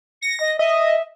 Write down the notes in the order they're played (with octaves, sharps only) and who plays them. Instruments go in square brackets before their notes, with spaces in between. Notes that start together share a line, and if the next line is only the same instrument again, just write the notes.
[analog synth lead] A#6 [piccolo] C#7
[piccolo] D#5
[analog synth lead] D#5 [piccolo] E5